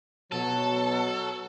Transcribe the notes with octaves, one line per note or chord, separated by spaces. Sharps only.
B2 F#3 A4